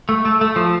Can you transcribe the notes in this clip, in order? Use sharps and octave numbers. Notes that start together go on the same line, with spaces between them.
A3
A3
A3
F3